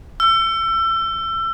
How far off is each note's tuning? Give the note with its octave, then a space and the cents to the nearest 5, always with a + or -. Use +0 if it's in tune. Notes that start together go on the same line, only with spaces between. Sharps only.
E6 +30